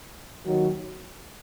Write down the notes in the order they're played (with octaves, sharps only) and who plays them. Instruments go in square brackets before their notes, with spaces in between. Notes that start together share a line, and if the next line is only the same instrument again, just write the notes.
[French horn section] D#2 D#3 F#3